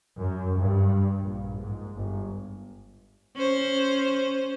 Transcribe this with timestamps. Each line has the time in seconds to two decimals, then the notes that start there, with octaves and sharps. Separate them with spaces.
0.17 F#2
0.58 G2
1.22 A#1
1.58 G#2
1.96 G1
3.35 C#4 C5